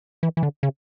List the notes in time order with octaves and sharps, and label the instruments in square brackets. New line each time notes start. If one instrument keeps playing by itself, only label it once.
[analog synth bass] E3
E3
D3
C#3